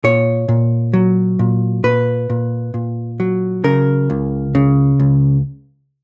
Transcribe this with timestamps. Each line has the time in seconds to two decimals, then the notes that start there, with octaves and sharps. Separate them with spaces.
0.04 A#2 C#5
0.48 A#2
0.93 F#3
1.39 A#2
1.84 A#2 B4
2.30 A#2
2.74 A#2
3.20 F#3
3.64 C#3 A#4
4.10 C#2
4.55 C#3
5.00 C#2